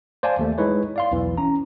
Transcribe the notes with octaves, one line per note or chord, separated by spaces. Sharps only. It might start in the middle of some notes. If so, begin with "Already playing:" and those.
C5 D5 F5 G#5 A5
D#2 A3
G#3 D#4 E4 B4 C#5
D5 F5 C6
B1 E2 E3
C#4 A#5